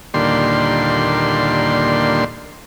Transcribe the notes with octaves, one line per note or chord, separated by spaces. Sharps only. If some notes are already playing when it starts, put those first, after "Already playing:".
D#2 A#2 D3 G3 C6